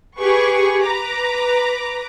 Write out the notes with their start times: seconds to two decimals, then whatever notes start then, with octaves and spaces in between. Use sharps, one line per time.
0.19 G4 G#4 B4 C#6
0.83 B4 A#5 D6